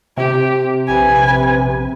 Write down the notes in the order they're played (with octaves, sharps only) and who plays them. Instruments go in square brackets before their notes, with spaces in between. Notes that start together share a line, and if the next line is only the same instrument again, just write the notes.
[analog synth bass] C3 [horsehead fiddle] G4
[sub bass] A#1 [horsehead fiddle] B4 G#5